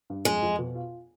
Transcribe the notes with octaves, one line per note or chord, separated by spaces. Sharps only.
G2
F2 G#3
F2
B2
F4